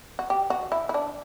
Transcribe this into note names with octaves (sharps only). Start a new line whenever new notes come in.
F#4
G4
F#4
E4
E4
D4